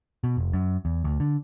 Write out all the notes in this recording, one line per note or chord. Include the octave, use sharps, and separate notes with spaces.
B2
F1
F#2
E2
D2
D3